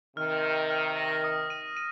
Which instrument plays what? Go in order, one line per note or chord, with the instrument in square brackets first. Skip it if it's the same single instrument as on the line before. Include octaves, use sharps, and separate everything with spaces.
[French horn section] C3 D#3 [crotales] F6
[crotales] F6
F6
A#6
D#6
D#7
D#7